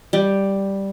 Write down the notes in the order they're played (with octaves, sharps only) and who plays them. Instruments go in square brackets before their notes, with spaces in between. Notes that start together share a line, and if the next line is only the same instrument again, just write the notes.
[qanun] G3